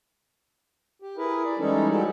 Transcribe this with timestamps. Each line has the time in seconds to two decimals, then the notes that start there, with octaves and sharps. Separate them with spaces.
1.02 G4
1.17 E4 G#4 A#4 B4
1.45 D5
1.59 E3 G3 G#3 C#4 D#4 A4
1.89 F#3 G#3 G4 A4